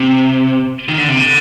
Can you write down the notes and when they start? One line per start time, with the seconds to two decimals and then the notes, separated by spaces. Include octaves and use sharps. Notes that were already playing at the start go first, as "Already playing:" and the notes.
Already playing: C3
0.89 D#3
0.98 D3
1.08 C3
1.19 D3